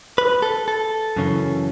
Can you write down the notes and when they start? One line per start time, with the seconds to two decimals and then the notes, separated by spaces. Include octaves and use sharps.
0.18 B4
0.42 A4
0.68 A4
1.16 F#2 C#3 E3